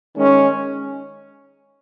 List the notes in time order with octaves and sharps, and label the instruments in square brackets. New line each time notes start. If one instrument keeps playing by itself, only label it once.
[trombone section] D#3 G#3 C#4